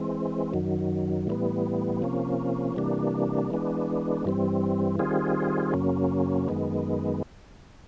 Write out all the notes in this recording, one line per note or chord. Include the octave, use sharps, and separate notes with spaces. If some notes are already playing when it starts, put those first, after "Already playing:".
Already playing: E3 G#3 C4
F#2 D#3 F#3
A2 E3 G3 B3
C3 F3 A#3 C#4
C3 E3 G3 A#3 D4
E3 G#3 B3 D4
G2 E3 G3 C4
D#3 G3 C4 F4 G#4
F#2 C#3 F#3 A#3 C#4
F#2 D#3 G#3 B3